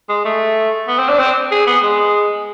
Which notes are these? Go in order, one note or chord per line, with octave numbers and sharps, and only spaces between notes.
G#3
A3
B3
C4
D4
C4
G#4
B3
G#3